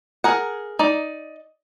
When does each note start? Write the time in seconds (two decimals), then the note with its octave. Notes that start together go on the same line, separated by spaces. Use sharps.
0.24 G#4 A#4 F#5
0.79 D#4 D5